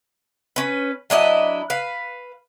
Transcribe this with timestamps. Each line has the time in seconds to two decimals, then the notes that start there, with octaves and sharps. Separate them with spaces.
0.56 C#4 B4
1.10 F#3 D4 E4 D#5
1.70 B4 F5